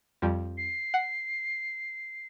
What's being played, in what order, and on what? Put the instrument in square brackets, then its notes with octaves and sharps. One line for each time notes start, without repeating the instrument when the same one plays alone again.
[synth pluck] F2 F3 G3
[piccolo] C7
[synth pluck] F#5